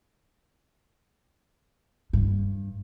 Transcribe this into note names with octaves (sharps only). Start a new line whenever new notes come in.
G2